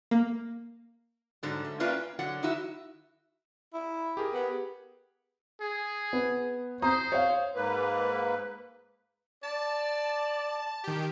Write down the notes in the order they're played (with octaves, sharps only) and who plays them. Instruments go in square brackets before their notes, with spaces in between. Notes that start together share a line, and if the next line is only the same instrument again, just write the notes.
[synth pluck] A#3
[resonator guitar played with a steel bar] G#2 D3 F#3
A3
A#3 C#4 F4 B4 D5 E5
G5
D3 F#3 F#5
D#4 E4 F#4 E5
[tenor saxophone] E4
[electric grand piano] G4 G#4 A#4
[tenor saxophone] B3
[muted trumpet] G#4
[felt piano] B3
[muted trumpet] C5 [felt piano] A#5 D#6
[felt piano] C#5 F5
[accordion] G#2 A#3 B4
[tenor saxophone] D5 [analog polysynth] A5
[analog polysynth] D#3 G4